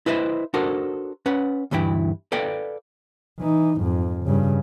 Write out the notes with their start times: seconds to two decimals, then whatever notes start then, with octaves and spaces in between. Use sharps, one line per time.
0.06 E4 B4 C5 D#5 E5
0.54 D4 F#4 A4 A#4 C5
1.26 C#4 B4 F#5
1.71 D2 G2 E3 E4 G5
2.32 A4 B4 D5 F5 G5
3.39 E3 D#4
3.78 F2 G#2
4.23 G2 C#3